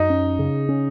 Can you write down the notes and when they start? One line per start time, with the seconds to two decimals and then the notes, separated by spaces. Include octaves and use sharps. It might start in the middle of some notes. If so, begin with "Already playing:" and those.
Already playing: F#2 D#4
0.10 C#4
0.39 C#3
0.69 C#4